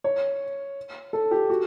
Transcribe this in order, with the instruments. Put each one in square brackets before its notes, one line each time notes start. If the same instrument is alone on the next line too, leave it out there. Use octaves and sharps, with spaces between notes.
[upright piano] C#5
A4
G4
F#4